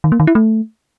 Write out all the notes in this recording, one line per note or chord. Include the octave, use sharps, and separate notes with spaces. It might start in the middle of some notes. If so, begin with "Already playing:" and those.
D#3
A#3
D#3
E4
A3